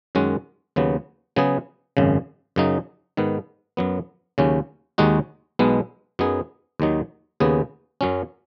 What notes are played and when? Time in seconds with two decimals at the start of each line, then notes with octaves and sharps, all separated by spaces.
0.15 F#2 D#3 G#3 C#4 F#4
0.76 D#2 C#3 F#3 B3
1.36 C#3 F#3 B3 G#4
1.97 G#1 F#2 C#3
2.56 F#2 C#3 F#3 D#4
3.17 G#2 D#3 B3
3.77 F#2 F#3 B3
4.38 D#2 C#3 F#3 C#4
4.98 D#2 D#3 G#3 D#4 F#4
5.59 B1 B2 G#3 B3
6.19 F#2 F#3 B3 D#4 G#4
6.80 D#2 D#3 F#3 D#4
7.40 D#2 C#3 B3 G#4
8.01 F#2 F#3 C#4